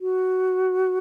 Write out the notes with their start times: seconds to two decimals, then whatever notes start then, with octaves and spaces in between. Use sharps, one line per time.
0.01 F#4